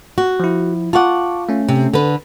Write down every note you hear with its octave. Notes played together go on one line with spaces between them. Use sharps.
F#4
F3 E4
F4 F#5 A5 C#6 D6
A3 C#4
C3
D3 B4